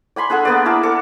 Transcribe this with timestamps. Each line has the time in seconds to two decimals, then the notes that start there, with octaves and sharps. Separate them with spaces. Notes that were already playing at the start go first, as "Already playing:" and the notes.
0.16 D5 G#5 B5 C6
0.30 D4 G#4 A4 F#5
0.45 A#3 B3 D5
0.65 E4 A#4 A5 D6
0.83 A4 D5 D6